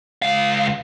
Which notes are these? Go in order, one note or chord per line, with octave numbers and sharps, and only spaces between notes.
C#2 F5